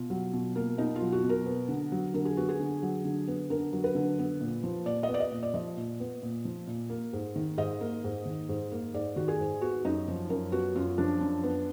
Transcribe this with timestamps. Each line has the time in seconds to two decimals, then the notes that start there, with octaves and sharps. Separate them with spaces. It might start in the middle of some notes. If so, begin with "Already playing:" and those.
Already playing: B2 F4
0.10 F#3
0.33 B2
0.55 A#3
0.78 B2 D#4
0.96 F4
1.01 F#3
1.12 F#4
1.24 B2
1.29 A#4
1.46 B3
1.68 D3
1.92 F#3
2.14 D3 A#4
2.25 G#4
2.37 B3 F#4
2.49 G#4
2.60 D3
2.83 F#3
3.05 D3
3.28 B3
3.50 D3 A#4
3.73 F#3
3.84 B4
3.95 D3
4.19 B3
4.41 A#2
4.64 F3
4.86 A#2 D5
5.03 D#5
5.09 B3
5.14 D5
5.20 D#5
5.32 A#2
5.43 D5
5.54 F3 D#5
5.77 A#2
6.00 B3
6.23 A#2
6.45 F3
6.67 A#2
6.90 A#3
7.13 G#2
7.36 D#3
7.58 G#2 D#5
7.81 A#3
8.04 G#2
8.25 D#3
8.49 G#2
8.72 A#3
8.94 G#2 D5
9.16 D#3 F#4
9.28 G#4
9.40 G#2
9.61 B3 F#4
9.85 F#2 D#4
10.08 F3
10.29 F#2 A#4
10.52 B3 F#4
10.76 F#2 F4
10.98 F3 D4
11.21 F#2
11.44 B3